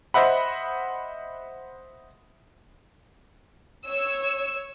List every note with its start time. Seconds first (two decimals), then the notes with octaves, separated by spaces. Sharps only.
0.14 C5 D#5 E5 F#5 B5
3.88 C#5 E6